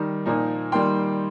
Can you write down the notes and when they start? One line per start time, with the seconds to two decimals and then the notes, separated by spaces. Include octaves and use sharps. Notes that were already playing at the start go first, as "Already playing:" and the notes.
Already playing: D#3 G3 D#4
0.26 A#2 F3 A#3 D#4
0.72 D#3 G3 A#3 D#4 G5 C6